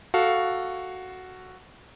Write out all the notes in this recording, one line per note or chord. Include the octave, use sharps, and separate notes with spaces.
F#4 A4 F5